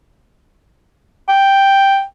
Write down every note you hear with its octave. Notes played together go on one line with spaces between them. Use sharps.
G5